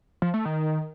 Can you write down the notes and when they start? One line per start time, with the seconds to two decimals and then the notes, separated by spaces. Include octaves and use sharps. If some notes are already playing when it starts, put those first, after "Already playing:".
0.22 F3
0.34 A3
0.45 D#3